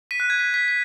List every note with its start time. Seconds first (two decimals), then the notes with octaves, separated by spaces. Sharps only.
0.11 B6 D#7
0.20 F#6
0.30 G#6
0.39 B6
0.54 B6
0.68 B6